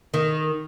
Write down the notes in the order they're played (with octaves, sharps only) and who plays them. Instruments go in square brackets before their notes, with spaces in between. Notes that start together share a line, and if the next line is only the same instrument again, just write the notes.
[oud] D#3